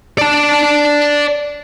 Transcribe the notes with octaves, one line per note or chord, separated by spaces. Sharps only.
D5 A5